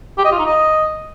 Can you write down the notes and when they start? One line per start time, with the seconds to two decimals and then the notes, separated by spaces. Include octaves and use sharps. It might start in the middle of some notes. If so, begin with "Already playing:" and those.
0.18 G4
0.25 D#5
0.32 F4
0.39 D#4
0.46 D#5